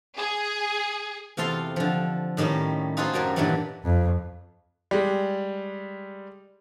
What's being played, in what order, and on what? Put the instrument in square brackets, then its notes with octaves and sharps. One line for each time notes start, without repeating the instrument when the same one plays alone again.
[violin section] G#4
[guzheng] E2 C3 F4 A4 F5 C6
D3 F3
A2 D#3 G3 C#4 D#4
D#4 F4 F#4 G#4 A4 C5
F#2 F#3 G3 A#4
G2 A#2 D#3 E3 F#3 G3
[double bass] F2
[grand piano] G3 G#3